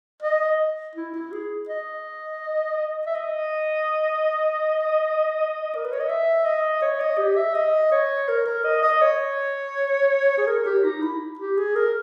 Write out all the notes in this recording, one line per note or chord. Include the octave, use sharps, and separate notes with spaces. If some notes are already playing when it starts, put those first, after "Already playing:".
D#5
E4
E4
G#4
D#5
E5
D#5
A#4
B4
C#5
D#5
E5
D#5
C#5
D#5
G4
E5
D#5
C#5
A#4
A#4
D#5
D#5
C#5
G#4
A#4
G4
D#4
E4
G4
G#4
A#4